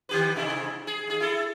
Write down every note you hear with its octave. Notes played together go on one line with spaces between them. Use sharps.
D#3 G4 B4
G#2 C3 E4
G#4
D#2 G#4
E4 A4